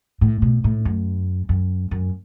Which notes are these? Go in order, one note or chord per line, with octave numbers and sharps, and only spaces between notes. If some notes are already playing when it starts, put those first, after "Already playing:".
A2
B2
A2
F#2
F#2
F#2